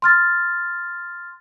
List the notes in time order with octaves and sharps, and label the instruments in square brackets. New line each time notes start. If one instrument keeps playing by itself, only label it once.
[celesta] C6 F6 A6